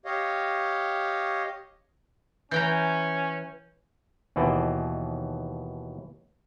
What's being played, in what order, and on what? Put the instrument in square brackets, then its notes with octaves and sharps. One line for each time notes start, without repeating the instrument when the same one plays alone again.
[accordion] G4 C#5 D#5 F5
[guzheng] E3 G5 A#5 [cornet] C#4 [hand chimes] G6
[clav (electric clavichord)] D#2 B2 E3 C5 D5 D#5